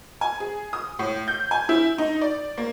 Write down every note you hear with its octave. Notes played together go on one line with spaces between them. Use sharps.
G#5
G#4
D#6
A2
G6
G#5
E4
D#4
D5
A#3